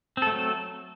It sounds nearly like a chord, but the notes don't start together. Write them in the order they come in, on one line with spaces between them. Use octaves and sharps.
C4 A4 A3 F#3